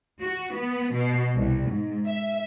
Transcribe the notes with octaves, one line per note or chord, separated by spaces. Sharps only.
F#4
B3
B2
C2
G#2
E5